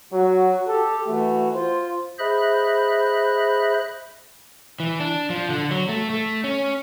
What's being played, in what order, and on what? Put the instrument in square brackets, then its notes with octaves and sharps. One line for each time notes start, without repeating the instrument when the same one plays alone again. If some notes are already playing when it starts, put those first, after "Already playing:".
[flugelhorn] F#3 [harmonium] F#4
[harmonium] G4 [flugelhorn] A4
[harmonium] E3 F#4 [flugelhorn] A3
[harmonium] F4 [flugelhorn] C5
[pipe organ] G#4 C5 D#5 E5 B5 F#6
[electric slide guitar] E3
D4
F3
D3
F#3
A3
A3
C#4